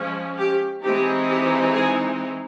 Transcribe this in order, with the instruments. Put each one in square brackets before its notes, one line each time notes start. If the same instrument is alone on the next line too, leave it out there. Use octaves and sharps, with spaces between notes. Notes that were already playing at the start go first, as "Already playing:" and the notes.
Already playing: [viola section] F3 G#3 C#4
G4
E3 G#3 C4 D#4 G4
G4
G#4